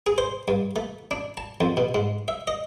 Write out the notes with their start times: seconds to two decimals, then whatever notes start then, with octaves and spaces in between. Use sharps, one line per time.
0.07 G#4
0.18 C5
0.48 G2
0.76 A3
1.11 D4
1.37 A5
1.61 F2
1.77 B2
1.95 G#2
2.28 E5
2.47 D#5